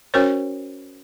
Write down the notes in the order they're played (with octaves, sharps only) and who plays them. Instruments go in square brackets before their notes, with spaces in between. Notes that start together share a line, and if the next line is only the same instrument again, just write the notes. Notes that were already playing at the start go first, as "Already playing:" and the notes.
[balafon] C#4 F#4 A#4 C5 C#5